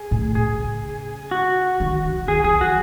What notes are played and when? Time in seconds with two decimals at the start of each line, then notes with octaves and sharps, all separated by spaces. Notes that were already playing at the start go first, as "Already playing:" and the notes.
Already playing: G#4
0.11 A2
0.35 C#3 G#4
1.31 F#4
1.80 D#3
2.05 D#3
2.28 D#3 G#4
2.44 E3 G#4
2.60 F#3 F#4